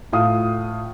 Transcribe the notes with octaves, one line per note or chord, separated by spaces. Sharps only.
A2 F4 F5 D#6